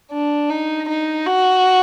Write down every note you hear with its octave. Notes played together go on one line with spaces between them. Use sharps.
D4
D#4
D#4
F#4